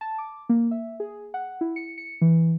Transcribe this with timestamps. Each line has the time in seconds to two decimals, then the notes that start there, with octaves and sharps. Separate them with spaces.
0.01 A5
0.18 D6
0.49 A#3
0.71 E5
1.00 G#4
1.34 F#5
1.61 E4
1.76 C#7
1.98 C#7
2.21 E3